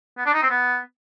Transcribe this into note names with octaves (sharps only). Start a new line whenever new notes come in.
B3
D4
D#4
C4
B3